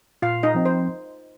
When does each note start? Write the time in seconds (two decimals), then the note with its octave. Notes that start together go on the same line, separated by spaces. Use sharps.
0.22 A#2 F4 F5
0.43 D#4 D#5
0.55 F3 C4
0.66 C5